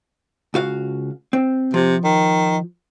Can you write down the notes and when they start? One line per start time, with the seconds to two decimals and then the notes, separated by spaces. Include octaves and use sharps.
0.54 C#2 F#4 F5
1.33 C4
1.74 C3 F3
2.05 D#3